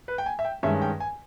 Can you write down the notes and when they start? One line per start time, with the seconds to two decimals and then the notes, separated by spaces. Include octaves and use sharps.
0.08 B4
0.18 G5
0.26 G#5
0.39 E5
0.45 G5
0.63 G2 D#3 G#3 C#4 E5
0.82 G5
1.00 G#5